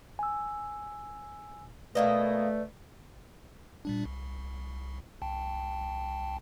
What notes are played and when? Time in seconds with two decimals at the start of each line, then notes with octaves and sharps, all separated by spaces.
0.19 G#5 E6
1.95 B2 A3 A#3 B4 D5 D#5
3.85 A#2 G3 D4
4.05 C2
5.22 C2 G5 A5